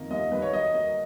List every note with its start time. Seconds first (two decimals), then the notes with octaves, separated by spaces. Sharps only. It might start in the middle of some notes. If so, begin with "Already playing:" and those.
Already playing: F2 D#3 A#3 D#5
0.10 D#2 D#5
0.32 D#2 B4
0.42 C#5
0.53 F#3 D#5
0.74 A#3 D#5